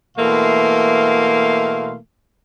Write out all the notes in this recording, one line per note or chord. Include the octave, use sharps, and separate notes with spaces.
B2 E3 A3 A#3 F5 C6